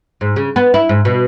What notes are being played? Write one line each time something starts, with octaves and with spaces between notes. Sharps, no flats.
G#2
C#3
B3
E4
G#2
B2